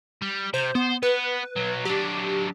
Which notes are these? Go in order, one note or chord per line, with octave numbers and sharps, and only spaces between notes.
G3
C3 C5
B3 C5
B3 B4
B1 F#3
F#3 D4 G4